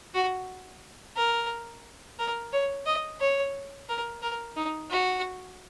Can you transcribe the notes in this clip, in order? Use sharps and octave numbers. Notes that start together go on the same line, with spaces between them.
F#4
A#4
A#4
C#5
D#5
C#5
A#4
A#4
D#4
F#4